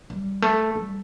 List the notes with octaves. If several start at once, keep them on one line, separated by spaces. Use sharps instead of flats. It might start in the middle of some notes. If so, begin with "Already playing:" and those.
G3
A3
G3